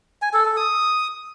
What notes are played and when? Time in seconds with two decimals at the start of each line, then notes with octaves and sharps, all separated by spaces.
0.22 G#5
0.33 A4
0.45 A4
0.57 D#6